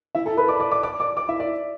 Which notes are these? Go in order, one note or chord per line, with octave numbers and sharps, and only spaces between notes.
E4 E5
A4 A5
B4 B5
D5 D6
D5 D6
D5 D6
D5 D6
D5 D6
D5 D6
E4 E5
D5